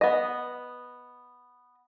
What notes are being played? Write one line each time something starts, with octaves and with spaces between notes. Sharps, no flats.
B3 D#5